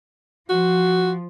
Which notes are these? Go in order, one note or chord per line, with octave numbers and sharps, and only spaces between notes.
F3 F#4